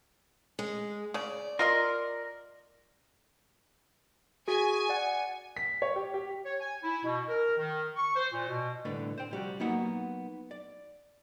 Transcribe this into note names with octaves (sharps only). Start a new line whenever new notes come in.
G#3
C#3 D5
F4 A#4 D#5 C6
F#4 G#4 G#5
D5 F#5
B6
C#5
G4
G4
C#5
G#5
E4
B2
A#4
D#3
C#6
C5
A#2
B2
C2 A2 D3 B4 D5
C5 G5
C2 G3 F#4
F#3 A#3 B3 D#4 F#5
D5